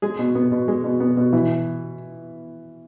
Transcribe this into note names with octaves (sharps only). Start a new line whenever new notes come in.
G#3 G#4
B2
B3
B2
G#3
B2
B3
B2
E3